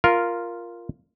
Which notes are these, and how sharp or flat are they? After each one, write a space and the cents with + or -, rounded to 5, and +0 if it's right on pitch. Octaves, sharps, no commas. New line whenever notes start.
F4 -5 A#4 +0